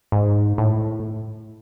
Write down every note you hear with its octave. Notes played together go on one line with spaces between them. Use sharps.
G#2
A2